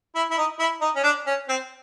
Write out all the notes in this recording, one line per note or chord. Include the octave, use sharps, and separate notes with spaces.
E4
E4
D#4
E4
D#4
C#4
D4
C#4
C4